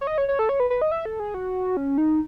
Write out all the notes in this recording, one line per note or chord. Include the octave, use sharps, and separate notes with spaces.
C#5
D#5
C#5
C#5
A4
C#5
B4
B4
D#5
E5
A4
G#4
F#4
C#4
D#4